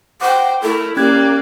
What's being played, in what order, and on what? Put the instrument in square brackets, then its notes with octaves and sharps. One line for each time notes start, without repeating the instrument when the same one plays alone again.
[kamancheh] C5 G5 [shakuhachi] F#5 [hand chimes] D6
[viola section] A3 E4 [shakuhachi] A4 [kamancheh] A#4
[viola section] A#3 [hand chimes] C#4 F#6 G#6 [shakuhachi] G4 [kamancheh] D5